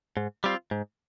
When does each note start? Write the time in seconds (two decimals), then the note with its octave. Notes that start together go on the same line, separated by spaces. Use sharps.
0.17 G#2
0.44 G3 C4 F4
0.71 G#2